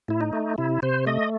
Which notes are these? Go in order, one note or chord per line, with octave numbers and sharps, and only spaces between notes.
A2 E4
D#4
A3
C3 E4
C3 C5
A3 D#5